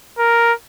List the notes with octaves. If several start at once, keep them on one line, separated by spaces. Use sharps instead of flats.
A#4